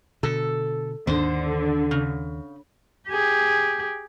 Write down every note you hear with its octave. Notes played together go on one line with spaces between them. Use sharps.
B2 D3 A4
D#2 G#2 D3 D#3 C5
C#3
G4 G#4